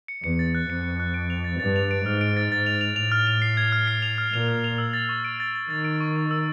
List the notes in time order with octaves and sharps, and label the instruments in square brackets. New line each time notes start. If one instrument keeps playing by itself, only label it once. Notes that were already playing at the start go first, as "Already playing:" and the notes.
[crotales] C#7
[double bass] E2 [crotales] C#7
[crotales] A6
F#6
[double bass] F2 [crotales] C#7
[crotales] C#7
F#6
D7
F7
A6
[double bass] G2 [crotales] A6
[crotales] F7
D7
[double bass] G#2 [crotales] F6
[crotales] D7
A6
[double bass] G#2 [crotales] A6
[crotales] F7
F7
[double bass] A2 [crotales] F7
[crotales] F6
F7
C7
G#6
F6
C7
F7
F6
[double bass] A#2 [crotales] F7
[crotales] F6
F7
E6
A6
C#6
D7
A6
A6
[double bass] D#3 [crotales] A6
[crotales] D7
C#6
C#6
E6